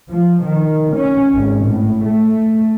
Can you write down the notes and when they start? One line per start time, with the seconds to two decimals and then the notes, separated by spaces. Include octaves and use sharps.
0.11 F3
0.44 D#3
0.95 C#4
1.35 G#1
1.64 A2
2.04 A3